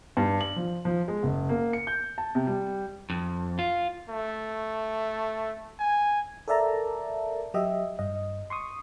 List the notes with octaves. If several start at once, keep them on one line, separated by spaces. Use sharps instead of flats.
G2
F#7
F3
F3
G#3
F#1
A#3
C#7
G6
A5
C3
G3
F2
F4
A3
G#5
A4 A#4 D5 E5 A5 A#5
F#3 G4 D#5 E5
G2 D#5
C6 C#6 D#6